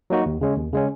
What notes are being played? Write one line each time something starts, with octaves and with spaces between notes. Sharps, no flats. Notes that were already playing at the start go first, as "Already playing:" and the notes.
F#3 A#3 D#4 F#4
D#2
C#3 G#3 C#4
D#2
C#3 G#3 C#4